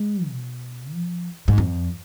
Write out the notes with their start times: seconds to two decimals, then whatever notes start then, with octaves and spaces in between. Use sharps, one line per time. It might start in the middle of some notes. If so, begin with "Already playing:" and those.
Already playing: G#3
0.28 B2
0.93 F3
1.48 G#2
1.58 F2